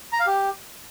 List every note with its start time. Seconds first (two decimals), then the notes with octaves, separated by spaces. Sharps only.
0.13 A#5
0.20 F5
0.27 G4